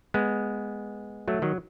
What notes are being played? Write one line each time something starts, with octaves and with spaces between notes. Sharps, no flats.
G#3 B3
F#3 A3
D#3 F#3